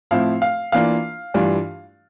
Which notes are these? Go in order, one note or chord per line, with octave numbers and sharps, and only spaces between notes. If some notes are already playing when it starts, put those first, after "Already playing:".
A2 F3 C4 E4 F5
F5
E3 A#3 D4 F4 F5
G2 E3 G3 D4 F4